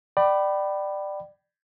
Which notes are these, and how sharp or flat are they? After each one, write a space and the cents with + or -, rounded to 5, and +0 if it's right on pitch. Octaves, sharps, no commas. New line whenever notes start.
D5 +20 G5 -30 B5 +0